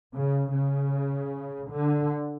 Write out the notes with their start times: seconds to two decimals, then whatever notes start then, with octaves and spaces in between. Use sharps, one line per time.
0.14 C#3
0.53 C#3
1.71 D3